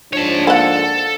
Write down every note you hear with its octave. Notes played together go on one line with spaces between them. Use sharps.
G#2 F3 D4 C#5 A5
A#3 A4 F#5